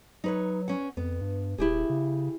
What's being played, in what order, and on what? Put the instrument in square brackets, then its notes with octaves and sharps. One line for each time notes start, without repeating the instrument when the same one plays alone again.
[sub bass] F#3 [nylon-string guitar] D#4 B4 C#5
[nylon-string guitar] C#4 F#5
[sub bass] F2 [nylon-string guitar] B3
[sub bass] G2
[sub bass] D#1 [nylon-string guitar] E4 G4 G#4
[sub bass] C#3